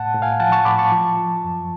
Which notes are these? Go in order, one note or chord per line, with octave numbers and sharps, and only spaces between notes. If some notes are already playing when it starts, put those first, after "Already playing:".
Already playing: A2 F#5 A5
A2
F5 G#5
F3 F#5 A5
A5 C#6
A2 B5 D6
A5 C#6
F3
F3
F#2